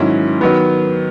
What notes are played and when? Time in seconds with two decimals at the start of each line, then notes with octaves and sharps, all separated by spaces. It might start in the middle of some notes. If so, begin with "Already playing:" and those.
Already playing: G#2 D#3 F#3 C#4 E4
0.41 D#3 F#3 B3